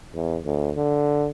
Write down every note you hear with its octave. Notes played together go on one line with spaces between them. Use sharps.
E2
D2
D3